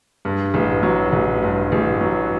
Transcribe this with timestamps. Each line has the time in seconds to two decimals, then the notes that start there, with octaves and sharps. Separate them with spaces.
0.25 G2
0.54 A1
0.83 F#3
1.13 A1
1.42 G2
1.72 A1
2.01 F#3